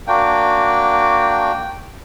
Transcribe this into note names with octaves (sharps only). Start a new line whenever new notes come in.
A#3 D4 F#4 G5